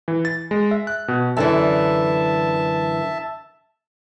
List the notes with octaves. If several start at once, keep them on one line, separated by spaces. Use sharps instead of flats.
E3
A6
G#3
E5
F#6
B2
F#2 D3 E3 E5 A5